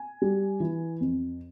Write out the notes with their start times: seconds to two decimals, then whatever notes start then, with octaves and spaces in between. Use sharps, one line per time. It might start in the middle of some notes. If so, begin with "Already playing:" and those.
Already playing: G#5
0.22 G3
0.60 E3
1.01 F2